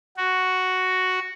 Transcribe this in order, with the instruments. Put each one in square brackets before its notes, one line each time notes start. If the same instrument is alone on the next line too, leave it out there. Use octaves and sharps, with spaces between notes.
[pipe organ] F#4